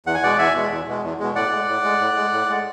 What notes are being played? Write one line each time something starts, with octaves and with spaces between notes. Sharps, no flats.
E2 F#5
G#5
B2 G#3 D5 F#5
E2 E5 G#5
B2 G#3
E2
B2 G#3
E2
B2 G#3
A2 D5 F#5
G#3
A2
G#3
A2
G#3
A2
G#3